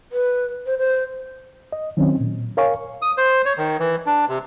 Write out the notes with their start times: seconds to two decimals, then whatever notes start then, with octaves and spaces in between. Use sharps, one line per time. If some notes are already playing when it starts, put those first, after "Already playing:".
0.12 B4
0.66 C5
0.78 C5
1.72 D#5
1.97 D#3 F#3 C4 C#4
2.20 A#2
2.57 A#4 C#5 F5 G#5 C#6
3.02 D#6
3.18 C5
3.45 C#5
3.57 D#3
3.79 E3
4.06 D4
4.28 C3